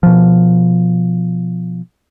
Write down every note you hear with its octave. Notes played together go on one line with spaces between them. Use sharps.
B2 F3